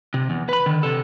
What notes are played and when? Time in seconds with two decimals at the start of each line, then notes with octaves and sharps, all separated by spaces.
0.14 C3
0.30 E2
0.49 B4 B5
0.66 D3 D#3
0.83 C3 A4